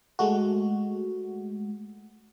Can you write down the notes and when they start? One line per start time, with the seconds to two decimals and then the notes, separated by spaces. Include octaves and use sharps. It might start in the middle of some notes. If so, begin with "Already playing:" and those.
0.19 G#3 A3 F#4